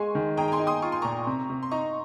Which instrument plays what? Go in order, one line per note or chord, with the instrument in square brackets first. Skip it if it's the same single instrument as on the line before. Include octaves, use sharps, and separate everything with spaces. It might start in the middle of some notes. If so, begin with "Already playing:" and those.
Already playing: [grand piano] G#3 [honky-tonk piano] G#5 C6 C#6
[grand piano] D#3
[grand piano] G#4 [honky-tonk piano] G5 A#5
[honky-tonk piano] A#5
G#5 C6
[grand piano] D#4
[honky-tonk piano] C6 D#6
[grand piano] F4 [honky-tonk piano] C#6
[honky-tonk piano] C6
[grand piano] A#2 [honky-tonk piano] A#5 C#6
[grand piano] C3
C3
[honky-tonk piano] C6
[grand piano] D#4 [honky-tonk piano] A#5 C#6